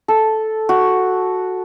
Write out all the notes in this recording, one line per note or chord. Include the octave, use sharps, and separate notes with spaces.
A4
F#4